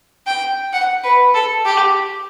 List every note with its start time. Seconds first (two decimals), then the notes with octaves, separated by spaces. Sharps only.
0.27 G5
0.73 F#5
1.04 B4
1.34 A4
1.65 G4